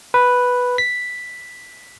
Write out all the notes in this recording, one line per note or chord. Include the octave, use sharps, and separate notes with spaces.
B4
B6